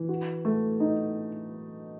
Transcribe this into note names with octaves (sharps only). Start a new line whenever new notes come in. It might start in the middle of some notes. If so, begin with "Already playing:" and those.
Already playing: E3
F#4
A3
D#4